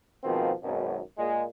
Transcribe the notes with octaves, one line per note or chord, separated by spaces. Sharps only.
B2 D#3 F3 G#3 A#3 C4
G#1 F#2 B2
A#2 G#3